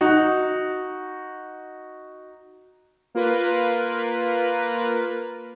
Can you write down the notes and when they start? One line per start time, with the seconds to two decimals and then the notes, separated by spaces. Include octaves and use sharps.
0.01 D#4 F#4
3.15 A#3 F4 A#4 B4